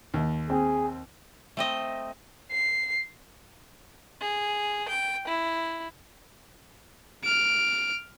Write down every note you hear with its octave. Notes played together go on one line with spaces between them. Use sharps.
D#2
C4 G#4
A3 C4 D#5
C7
G#4
G5
E4
F6 D7